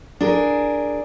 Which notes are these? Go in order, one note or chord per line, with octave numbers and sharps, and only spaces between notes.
D4 G#4 A#4